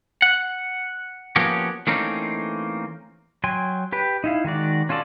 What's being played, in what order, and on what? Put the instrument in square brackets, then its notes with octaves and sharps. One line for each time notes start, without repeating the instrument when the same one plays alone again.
[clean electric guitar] F#5
F3 A#3 B3 C#4 F#4 G4
E3 A3 A#3 C4 C#4 D#4
[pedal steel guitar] F#3 G5 G#5 C6
G4 B4 G5
D#4 E4 F5
D#3 G#3 F#4 D5
C#4 F4 F#4 A4 D5